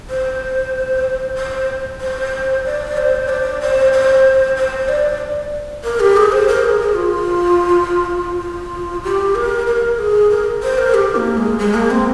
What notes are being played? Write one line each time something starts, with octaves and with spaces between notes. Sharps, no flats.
C5
C5
C5
D5
C5
D5
C5
C5
C5
D5
A#4
G4
G#4
C5
A#4
G#4
G#4
F4
F4
G4
A#4
A#4
G#4
A#4
C5
A#4
G4
A#3
G#3
G#3
A#3
C4